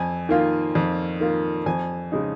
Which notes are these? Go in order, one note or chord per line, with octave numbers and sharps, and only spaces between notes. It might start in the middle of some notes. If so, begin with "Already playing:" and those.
Already playing: F2 G#5
D#3 A#3 F4
F2
D#3 A#3 F4
F2 G#5
C#3 G#3 D#4